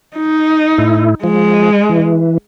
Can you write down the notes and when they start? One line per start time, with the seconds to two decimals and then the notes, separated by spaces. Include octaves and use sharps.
0.17 D#4
0.78 A2 E4
1.24 F3 G#3
1.89 E3